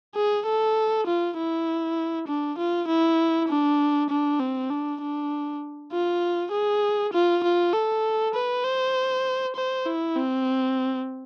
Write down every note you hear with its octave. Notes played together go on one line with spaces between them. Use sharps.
G#4
A4
F4
E4
D4
F4
E4
D4
D4
C4
D4
D4
F4
G#4
F4
F4
A4
B4
C5
C5
E4
C4